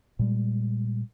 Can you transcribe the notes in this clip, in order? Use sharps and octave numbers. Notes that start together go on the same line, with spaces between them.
A#2 G3 G#3